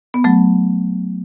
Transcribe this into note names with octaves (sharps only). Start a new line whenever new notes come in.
B3
F#3 A3